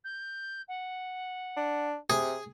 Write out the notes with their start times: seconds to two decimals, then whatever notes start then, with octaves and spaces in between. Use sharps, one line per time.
0.04 G6
0.68 F#5
1.57 D4
2.10 C3 G#4